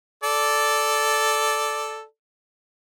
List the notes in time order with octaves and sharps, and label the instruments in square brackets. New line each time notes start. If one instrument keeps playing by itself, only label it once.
[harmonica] A4 D5